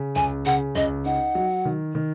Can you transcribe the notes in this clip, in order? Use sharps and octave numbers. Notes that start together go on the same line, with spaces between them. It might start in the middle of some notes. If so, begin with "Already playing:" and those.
Already playing: C#3
C#2 G#5
C#3 F#5
C#2 D#5
D#4 F#5
F#3
D#3
D#3